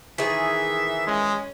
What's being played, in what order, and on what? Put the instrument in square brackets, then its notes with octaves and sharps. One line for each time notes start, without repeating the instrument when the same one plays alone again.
[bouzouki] D#3 G#4 [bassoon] E3 [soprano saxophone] E5
[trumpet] G#3 [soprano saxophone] C#4